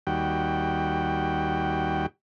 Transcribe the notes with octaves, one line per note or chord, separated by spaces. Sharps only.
D#2 G3 F#4 G5